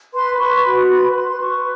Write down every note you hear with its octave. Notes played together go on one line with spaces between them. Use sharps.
B4 C6
B4 C#6
F#4 C6
B4 B5
B4 C6
C6
B4 C#6